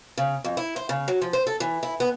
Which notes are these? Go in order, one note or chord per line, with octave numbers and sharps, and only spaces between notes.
C#3
F2
E4
C5
C#3
F#3
F3
C5
A4
E3
E4
B3